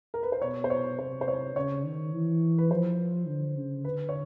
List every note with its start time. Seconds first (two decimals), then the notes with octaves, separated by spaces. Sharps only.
0.14 A#4
0.23 B4
0.32 C5
0.42 B2 C#5
0.64 C5
0.70 C#5
0.99 C3 C5
1.21 C5
1.28 C#5
1.56 C#3 C#5
1.85 D#3
2.13 E3
2.58 B4
2.70 F3 C5
3.27 D3
3.56 C#3
3.84 D3 B4
4.09 C#5